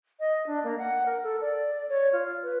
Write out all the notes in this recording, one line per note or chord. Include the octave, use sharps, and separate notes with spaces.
D#5
D4
A#3
F#5
A#4
A4
D5
C#5
F4
B4